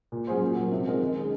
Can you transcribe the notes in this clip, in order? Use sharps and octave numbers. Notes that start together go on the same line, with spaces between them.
A#2
F#3 C#4 G#4 C5
A#2
F#3 A#3
C3
F3 G#3 D#4 A#4
D#3
G#3 C#4 G#4